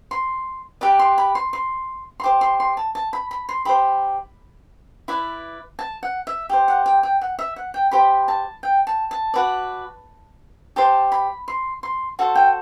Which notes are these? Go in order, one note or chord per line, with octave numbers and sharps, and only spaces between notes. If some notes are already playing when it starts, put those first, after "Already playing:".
C6
G4 B4 D5 D6
C6
B5
C6
C6
C6
G4 C5 D6
C6
C6
A5
A5
B5
B5
C6
G4 C5 B5
E4 B4 D5
A5
F#5
E5
G4 C5
F#5
G5
G5
F#5
E5
F#5
G5
G4 C5 B5
A5
G5
A5
A5
F#4 B4 D5
G4 C5 A5
B5
C6
C6
F#4 A4 C5 A5
G5